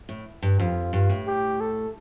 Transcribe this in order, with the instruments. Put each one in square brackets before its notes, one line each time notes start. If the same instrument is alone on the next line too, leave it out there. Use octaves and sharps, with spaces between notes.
[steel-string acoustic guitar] A2
G2
[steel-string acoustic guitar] F2 [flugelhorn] F4
[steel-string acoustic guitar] G2
A2
[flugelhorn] G4
A4